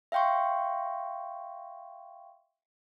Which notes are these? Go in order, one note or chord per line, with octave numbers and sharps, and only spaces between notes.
E5 F5 G5 C6 C#6